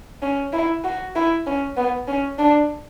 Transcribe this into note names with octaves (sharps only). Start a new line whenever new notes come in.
C#4
E4
F#4
E4
C#4
B3
C#4
D4